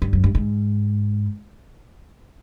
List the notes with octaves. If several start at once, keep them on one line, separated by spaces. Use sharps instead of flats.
G2
F#2
G2
G#2